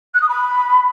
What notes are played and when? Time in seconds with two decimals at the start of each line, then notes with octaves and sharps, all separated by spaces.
0.14 F#6
0.21 D#6
0.29 B5